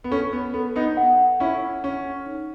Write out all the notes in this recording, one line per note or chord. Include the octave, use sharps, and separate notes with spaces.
B3
C#4 A4
B3
B3 A4
B3 D#4
F#5
C#4 E4 A4
C#4 F#5
D#4